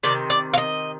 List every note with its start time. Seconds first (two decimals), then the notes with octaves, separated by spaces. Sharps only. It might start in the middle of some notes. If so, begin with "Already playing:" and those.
0.03 C3 D#3 D5
0.30 D5
0.54 F5
0.58 D#5